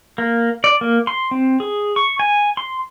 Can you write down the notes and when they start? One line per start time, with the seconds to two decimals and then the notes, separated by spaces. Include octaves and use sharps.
0.18 A#3
0.64 D5
0.81 A#3
1.07 C6
1.31 C4
1.60 G#4
1.96 C#6
2.20 G#5
2.57 C6